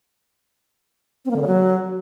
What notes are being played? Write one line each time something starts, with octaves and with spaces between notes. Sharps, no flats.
C4
A#3
D3
C#3
F#3